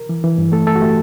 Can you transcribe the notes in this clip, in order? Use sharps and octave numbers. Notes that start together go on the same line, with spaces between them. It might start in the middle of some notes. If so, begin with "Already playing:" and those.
Already playing: A#4
E3
E3
G2
A3 A4
A3 A4
F#4
A3 G4